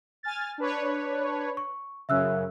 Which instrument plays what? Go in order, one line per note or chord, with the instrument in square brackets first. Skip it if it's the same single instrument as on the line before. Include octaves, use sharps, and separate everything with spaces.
[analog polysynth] G#5 F6 A6
D4 B4 C#5
[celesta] C#6
[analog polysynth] F#2 C#3 [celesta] E5 E6 F#6